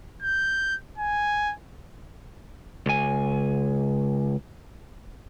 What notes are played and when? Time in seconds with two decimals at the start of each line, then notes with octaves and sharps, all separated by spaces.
0.23 G6
0.98 G#5
2.86 C#2 G#5